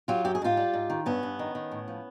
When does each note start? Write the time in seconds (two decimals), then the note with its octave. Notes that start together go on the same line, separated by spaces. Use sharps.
0.08 F#3 F4 G4
0.25 F#2 G4
0.35 G#4
0.42 G#2 F4 G4
0.57 G3
0.74 G#2
0.90 D#3
1.06 G2 B3 C#4
1.23 G2
1.39 D#3
1.55 D#3
1.72 A2
1.88 F3